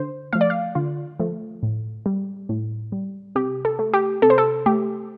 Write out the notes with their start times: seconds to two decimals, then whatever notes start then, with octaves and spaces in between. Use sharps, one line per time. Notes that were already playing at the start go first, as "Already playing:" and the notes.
Already playing: D3 C5
0.33 F3 A3 F5
0.41 D5
0.50 F5
0.75 D3 F4
1.19 F3 A3
1.63 A2
2.06 G3
2.49 A2
2.92 G3
3.35 C3 G4
3.65 A4
3.79 A3
3.94 G4
4.22 C3 A4
4.30 C5
4.38 A4
4.66 A3 G4